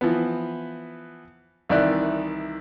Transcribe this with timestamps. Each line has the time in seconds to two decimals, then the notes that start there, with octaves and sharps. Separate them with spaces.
0.01 E3 F3 B3
1.69 C2 D#3 E3 D5 E5 F#6